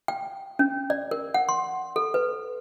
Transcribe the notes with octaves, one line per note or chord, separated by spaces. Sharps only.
G5
C#4
D5
A#4
F#5
C6
A4
B4